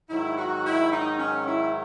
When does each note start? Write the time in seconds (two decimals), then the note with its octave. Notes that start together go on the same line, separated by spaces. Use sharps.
0.09 G#2 D#3 F#3 E4
0.37 F#4
0.65 E4
0.91 D#4
1.19 C#4
1.47 E4